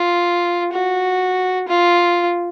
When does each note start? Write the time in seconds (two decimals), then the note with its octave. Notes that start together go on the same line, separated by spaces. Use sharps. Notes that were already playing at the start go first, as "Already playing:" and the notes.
Already playing: F4
0.72 F#4
1.68 F4